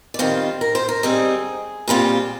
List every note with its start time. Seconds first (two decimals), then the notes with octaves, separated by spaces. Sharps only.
0.14 D5
0.19 D#3 G3 C4 F4 C5
0.61 A#4
0.75 C5
0.89 A#4
1.03 D3 G3 C4 D#4 G#4
1.88 A#2 G3 C4 F4